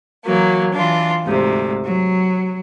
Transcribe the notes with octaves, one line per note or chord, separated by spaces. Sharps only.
E3 F#3 A#3
E3 D4 F4
D2 G#2 C3
F#3